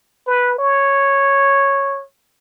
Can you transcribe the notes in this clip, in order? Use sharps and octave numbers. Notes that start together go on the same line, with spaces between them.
B4
C#5